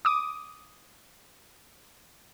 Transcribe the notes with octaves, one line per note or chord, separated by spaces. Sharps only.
D6 D#6